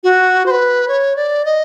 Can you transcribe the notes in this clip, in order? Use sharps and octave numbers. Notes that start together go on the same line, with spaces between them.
F#4
C5
B4
C#5
D5
D#5